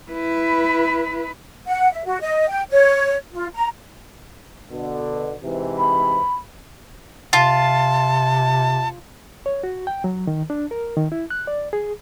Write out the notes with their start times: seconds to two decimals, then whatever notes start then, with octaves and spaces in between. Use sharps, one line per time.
0.11 E4 B4
1.67 F#5
1.92 E5
2.05 F#4
2.20 D#5
2.48 G5
2.70 C#5
3.32 F4
3.54 A#5
4.70 B2 D3
5.44 G#2 C3 E3
5.78 B5
7.33 C3 F4 A5
9.46 C#5
9.64 F#4
9.87 G5
10.04 F#3
10.27 D#3
10.50 D4
10.71 A#4
10.97 D#3
11.12 E4
11.30 F#6
11.47 D5
11.73 G#4